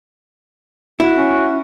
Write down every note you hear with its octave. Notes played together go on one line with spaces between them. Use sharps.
E4 F#4
C#4